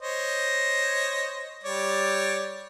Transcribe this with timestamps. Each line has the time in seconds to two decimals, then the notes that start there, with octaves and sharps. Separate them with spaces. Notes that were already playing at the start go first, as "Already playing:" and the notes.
0.01 C5 C#5 D#5
1.64 G3 C#5 D5